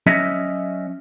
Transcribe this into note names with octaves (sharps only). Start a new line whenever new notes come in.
F#3 C#4 D#5 E5